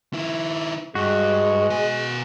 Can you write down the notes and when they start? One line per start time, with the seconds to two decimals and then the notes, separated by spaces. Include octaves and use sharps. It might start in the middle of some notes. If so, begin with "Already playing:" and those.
0.13 D#3 E4
0.95 G2 G#3 F#4
1.70 B2 G#5